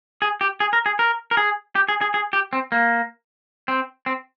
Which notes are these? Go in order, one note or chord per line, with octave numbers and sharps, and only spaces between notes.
G#4
G4
G#4
A#4
G#4
A#4
A#4
G#4
G4
G#4
G#4
G#4
G4
C4
A#3
C4
C4